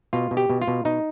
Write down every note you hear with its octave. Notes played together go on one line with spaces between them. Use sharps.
B2 F4
B2
G4
B2
F4
B2
B2 D#4